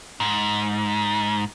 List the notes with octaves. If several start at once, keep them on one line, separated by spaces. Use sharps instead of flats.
G#2